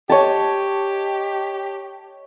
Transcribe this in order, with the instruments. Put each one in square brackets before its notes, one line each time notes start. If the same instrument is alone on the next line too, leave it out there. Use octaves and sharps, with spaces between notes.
[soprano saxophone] G4 [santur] C#5 D#5 A5